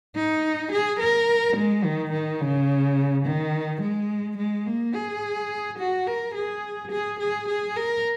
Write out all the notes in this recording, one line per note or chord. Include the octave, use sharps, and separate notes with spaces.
D#4
G#4
A#4
G#3
D#3
D#3
C#3
D#3
G#3
G#3
A#3
G#4
F#4
A#4
G#4
G#4
G#4
G#4
A#4